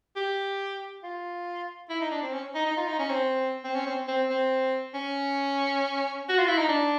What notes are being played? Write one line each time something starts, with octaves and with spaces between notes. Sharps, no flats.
G4
F4
E4
D#4
D4
C4
C#4
D#4
D#4
F4
D#4
C#4
C4
C4
C#4
C4
C4
C4
C#4
F#4
F4
E4
D#4
D4